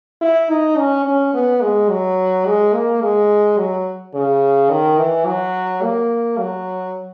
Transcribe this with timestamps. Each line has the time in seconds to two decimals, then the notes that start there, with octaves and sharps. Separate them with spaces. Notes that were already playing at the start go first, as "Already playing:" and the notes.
0.22 E4
0.50 D#4
0.78 C#4
1.06 C#4
1.34 B3
1.62 G#3
1.90 F#3
2.46 G#3
2.74 A#3
3.02 G#3
3.59 F#3
4.14 C#3
4.70 D#3
4.98 E3
5.26 F#3
5.83 A#3
6.39 F#3